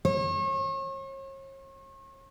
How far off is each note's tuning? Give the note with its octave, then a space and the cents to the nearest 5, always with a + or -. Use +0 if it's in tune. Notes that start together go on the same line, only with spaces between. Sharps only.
C#5 -40